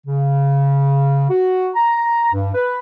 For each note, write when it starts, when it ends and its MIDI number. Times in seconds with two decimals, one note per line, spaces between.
0.06 1.27 49
1.30 1.69 66
1.76 2.31 82
2.33 2.51 43
2.54 2.79 71